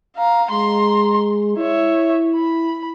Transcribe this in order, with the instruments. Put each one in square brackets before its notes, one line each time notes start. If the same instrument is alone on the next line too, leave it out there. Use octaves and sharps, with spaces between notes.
[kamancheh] F5 A#5
[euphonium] G#3 [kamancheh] A#5 C6
[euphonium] E4 [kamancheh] C#5 E5
[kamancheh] B5